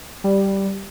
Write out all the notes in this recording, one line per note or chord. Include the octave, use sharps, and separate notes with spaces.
G3